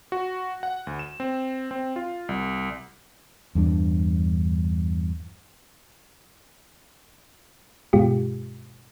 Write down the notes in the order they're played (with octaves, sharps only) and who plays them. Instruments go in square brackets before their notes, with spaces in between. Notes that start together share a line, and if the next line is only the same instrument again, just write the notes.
[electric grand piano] F#4
F#5
D2
E7
C4
C4
F4
C2
[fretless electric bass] E2 G2 D4
[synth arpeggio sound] G2 B2 G#3 F4 G4